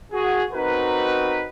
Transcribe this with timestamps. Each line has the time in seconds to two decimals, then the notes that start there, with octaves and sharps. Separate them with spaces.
0.13 F#4 G#4
0.53 C4 D#4 F#4 A#4 B4